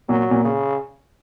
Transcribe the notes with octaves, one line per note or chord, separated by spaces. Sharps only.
A#2 F#3
A#2
C#3